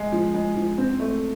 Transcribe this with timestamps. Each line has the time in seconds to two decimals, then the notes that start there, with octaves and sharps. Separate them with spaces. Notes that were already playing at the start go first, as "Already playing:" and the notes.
Already playing: G#3
0.12 F3
0.34 G#3
0.56 F3
0.78 C4
1.00 A3